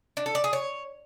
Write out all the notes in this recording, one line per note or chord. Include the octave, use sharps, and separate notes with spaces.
D4
A4
D5
G#4
C#5